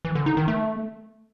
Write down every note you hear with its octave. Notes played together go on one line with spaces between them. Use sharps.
E3
D3
D#4
D#3
A3